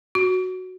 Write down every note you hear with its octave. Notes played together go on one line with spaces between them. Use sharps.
F#4